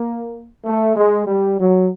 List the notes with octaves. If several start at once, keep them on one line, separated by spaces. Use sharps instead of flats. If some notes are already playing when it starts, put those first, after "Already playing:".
Already playing: A#3
A3
G#3
G3
F#3